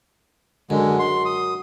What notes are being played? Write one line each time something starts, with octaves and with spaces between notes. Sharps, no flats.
F#2 D3 G#3
C6
D#6